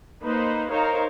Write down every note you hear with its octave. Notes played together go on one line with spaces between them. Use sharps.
A#3 D#4 B4 C5
D#4 A#4 C5 C#5 F5